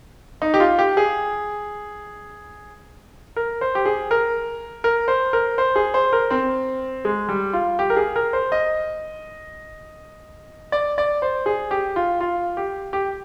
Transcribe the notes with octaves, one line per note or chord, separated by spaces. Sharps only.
D#4
G4
F4
G4
G#4
A#4
C5
G4
G#4
A#4
A#4
C5
A#4
C5
G#4
C5
A#4
C4
G#3
G3
F4
G4
A#4
G#4
A#4
C5
D#5
D5
D5
C5
G#4
G4
F4
F4
G4
G4